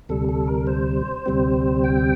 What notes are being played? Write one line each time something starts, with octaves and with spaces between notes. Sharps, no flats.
D2 C3 G3 A4
A4
A#4
C5
D2 C3 G3 C4
G5